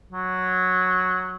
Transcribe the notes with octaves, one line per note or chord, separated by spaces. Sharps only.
F#3